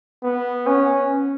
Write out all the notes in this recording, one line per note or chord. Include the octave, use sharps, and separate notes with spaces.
B3
C#4